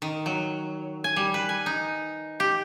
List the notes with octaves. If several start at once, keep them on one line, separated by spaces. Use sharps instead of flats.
D#3
F#3
G#5
G3
B4
G#5
D#4
G4